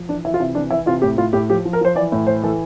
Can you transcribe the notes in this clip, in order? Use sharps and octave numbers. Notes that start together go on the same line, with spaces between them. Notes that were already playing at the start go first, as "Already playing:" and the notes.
Already playing: F3
E3 D4
E3 E4
F4
C3 E4
E3 D4
E3 E4
C3 F4
A2 G4
A2 F4
A2 G4
F3 G4
F3
A#4
F3 C5
E3 D5
A2
E3 C5
E3 A4